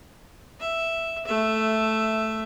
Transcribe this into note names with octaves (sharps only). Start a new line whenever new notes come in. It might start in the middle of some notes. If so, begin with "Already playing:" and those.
E5
A3 E5